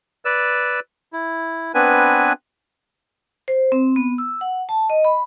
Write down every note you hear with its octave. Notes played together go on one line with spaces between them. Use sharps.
B4 D5 E6
E4
B3 C4 D4 B4 G#5
C5
C4
B3
E6
F#5
A5
D#5
B5